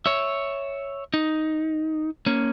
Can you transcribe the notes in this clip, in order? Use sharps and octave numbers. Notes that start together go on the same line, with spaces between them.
C#5 E5
D#4
A#3 C#4